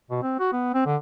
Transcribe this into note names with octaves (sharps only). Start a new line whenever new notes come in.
B2
C4
F#4
B3
C4
D3